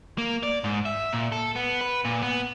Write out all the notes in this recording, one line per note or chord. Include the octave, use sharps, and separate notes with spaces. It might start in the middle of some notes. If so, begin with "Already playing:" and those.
A#3
D5
G#2
E5
A#2
A4
B3
B4
A#2
B3